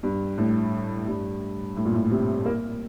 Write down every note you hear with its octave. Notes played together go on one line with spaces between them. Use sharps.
G2
A2
G2
A2
A#2
A2
C3
A#3